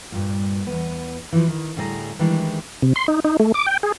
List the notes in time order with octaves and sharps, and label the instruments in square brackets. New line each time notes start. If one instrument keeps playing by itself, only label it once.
[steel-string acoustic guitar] G2 A#2
E2 B3
E3 F3
D#3
D2 A2 G3 G#4 D5 A#5
D#3 E3 G3 G#3 D4
[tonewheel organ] C3
C6
D#4
D#4
A3
D6
G5
G#4